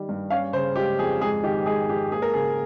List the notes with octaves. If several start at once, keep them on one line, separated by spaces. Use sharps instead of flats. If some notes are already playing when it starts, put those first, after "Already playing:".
Already playing: D#3 G3
G2
C#4 F5
C#3 C5
G#3 G4
F2 G#4
G#2 G#4
D#3 G4
G#3 G#4
G#2 G4
A#3 G#4
A#4
C#3 G#4